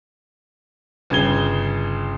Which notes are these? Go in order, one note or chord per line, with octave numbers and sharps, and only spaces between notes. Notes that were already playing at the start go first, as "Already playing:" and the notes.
G1 C#3 G#6 G7